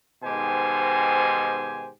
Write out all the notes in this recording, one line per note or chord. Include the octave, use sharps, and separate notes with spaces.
G#2 B2 D#3 G4 C5 G#5